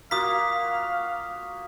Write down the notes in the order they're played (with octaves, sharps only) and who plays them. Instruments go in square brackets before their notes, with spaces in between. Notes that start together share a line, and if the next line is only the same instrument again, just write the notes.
[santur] A#3 F4 F#4 [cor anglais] F5 [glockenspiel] D#6 B6